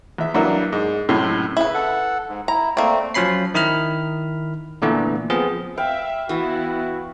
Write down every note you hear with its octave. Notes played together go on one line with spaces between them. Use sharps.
E2 E5
G2 F#3 G3 A#3 E4 F#4
G#2
C#2 F#2 A2 C3 C#4
C#3 E4 B4
A4 F#5
G#2
E4 A#5
A3 A#3 C4 D5
F3 F#3 C#4 B5 C7
D#3 E4 B5 F6
A#2 D3 E3 A3 B3
F3 B3 C4 G#4
B4 E5 F5 G5
E3 B3 E4 F#4